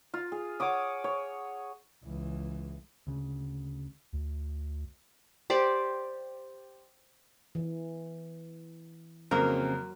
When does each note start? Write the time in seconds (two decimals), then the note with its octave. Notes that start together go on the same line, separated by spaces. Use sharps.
0.14 F4
0.32 G#4
0.60 C#5 F#5 D6 D#6
1.04 C#5
2.04 C#2 E3
3.07 D2 C#3
4.13 D2
5.50 G4 C5 D5
7.55 E3
9.31 F2 C#3 F#3 A#3 C4 A#4